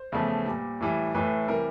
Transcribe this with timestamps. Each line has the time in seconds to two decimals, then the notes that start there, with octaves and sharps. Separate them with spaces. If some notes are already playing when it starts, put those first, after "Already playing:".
Already playing: C5
0.12 E2 C#3 F3 A3
0.46 A#2 G3
0.80 A2 E3 G3
1.15 A2 E3 A3 B4
1.48 C3 E3 G3 A#4